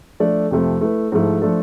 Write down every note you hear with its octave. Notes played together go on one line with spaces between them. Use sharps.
F3 A3 D4 A4 D5
F2 C3 F3 A3
A3 E4 B4
G#2 F3 A3 E4
F3 A3 D4 A4